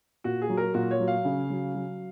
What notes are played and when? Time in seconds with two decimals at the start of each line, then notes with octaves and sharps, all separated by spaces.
0.24 A#2 F#4
0.42 G#4
0.49 F#3
0.57 A#4
0.74 A#2 F#4
0.91 C#5
1.00 F#3
1.08 F5
1.25 C#3
1.50 F#3
1.75 F#3